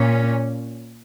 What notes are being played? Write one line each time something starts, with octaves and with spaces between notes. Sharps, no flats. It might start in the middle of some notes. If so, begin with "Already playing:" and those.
Already playing: A#2 C#4